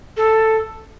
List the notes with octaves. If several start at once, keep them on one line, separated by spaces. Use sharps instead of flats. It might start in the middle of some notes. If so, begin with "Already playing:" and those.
A4